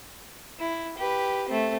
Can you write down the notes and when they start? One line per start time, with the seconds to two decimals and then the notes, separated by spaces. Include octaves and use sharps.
0.60 E4
0.97 G4 B4
1.49 A3 C4